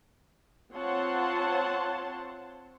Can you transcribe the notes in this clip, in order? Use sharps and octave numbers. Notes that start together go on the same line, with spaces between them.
C4 F4 C#5 F#5 A5 C6